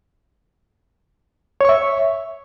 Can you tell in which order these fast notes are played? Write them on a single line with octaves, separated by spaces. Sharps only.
C#5 C#6 E5